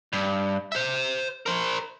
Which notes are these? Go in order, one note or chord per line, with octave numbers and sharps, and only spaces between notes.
G2
C5 E5
A#4 C5